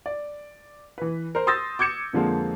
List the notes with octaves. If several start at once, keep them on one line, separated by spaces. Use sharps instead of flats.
D5
E3 B4
A#4 C5
C6 D#6 E6 G6 A6 A#6
D6 G6 G#6 C#7 E7
F2 D3 F3 G#3 A#3